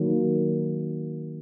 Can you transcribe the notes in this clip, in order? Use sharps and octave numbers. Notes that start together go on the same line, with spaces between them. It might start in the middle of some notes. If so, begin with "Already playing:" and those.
Already playing: D#3 F#3 A#3